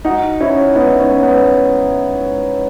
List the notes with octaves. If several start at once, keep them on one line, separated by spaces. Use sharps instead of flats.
D#4 F#4
C#4 E4
B3 D#4
C#4
B3